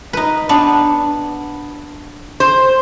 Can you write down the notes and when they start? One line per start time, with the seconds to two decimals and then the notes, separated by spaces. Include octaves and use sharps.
0.13 D#4 B4
0.49 B3 D4
2.40 C5